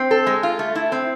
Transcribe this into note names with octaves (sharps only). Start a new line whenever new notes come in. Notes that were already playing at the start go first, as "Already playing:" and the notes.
Already playing: C4
A4
G#3
F4
A3
E4
C4